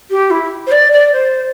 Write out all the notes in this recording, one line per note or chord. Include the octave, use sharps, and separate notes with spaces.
G4
E4
C5
D5
D5
C5